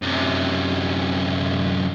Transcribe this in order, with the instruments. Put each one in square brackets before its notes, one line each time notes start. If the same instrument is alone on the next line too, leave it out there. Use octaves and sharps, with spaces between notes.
[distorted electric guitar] F#2 C3